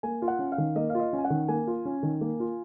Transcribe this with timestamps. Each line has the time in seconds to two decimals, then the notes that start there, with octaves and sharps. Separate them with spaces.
0.03 A#3 G#5
0.22 F4
0.28 F#5
0.39 C#4
0.52 F5
0.58 D#3
0.76 A#3 D#5
0.90 F5
0.95 F4 D#5
1.13 C#4
1.18 G#5
1.25 F#5
1.30 D#3
1.48 A#3 G#5
1.67 F4
1.85 C#4
2.03 D#3
2.21 A#3
2.40 F4